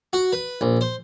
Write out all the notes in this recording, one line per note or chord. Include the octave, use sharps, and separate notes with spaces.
F#4
B4
A#1
C5